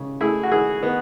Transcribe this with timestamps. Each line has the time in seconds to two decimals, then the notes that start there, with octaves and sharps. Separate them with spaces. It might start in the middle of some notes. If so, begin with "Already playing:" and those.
Already playing: C#3
0.21 A3 E4 G#4
0.43 F#4
0.52 D#3 E4 G#4
0.82 D#3 B3